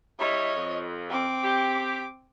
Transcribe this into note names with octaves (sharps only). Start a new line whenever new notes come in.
G3 G#3 E4 C#5 D#5
F2
C4 D6
G4